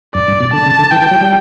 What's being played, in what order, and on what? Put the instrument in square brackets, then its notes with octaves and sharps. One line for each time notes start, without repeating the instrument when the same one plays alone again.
[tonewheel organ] F#2 [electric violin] D5
[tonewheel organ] G2
B2
[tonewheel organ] D3 [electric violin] A5
[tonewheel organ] C#3
D3
[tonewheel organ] E3 [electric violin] G5
[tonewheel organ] E3
F#3
G3